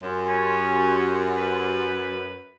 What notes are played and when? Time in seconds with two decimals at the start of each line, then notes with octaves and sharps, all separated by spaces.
0.02 F#2 G4 G#5 C6
0.28 C#4
1.36 B4